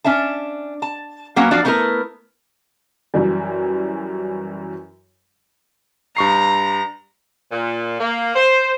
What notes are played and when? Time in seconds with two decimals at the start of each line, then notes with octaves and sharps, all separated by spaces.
0.04 C#4 D4 E5 A5
0.82 A5
1.36 F#3 A#3 B3 C#4 F#5
1.51 F3 D4 F#4 D5 F5
1.65 A3 B3 D4 E4 A#4 B4
3.14 F#2 E3 G3
6.17 G2 A#5 C#6 C7
7.51 A#2
7.99 A#3
8.35 C5